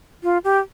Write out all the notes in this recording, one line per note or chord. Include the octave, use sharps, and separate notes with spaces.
F4
G4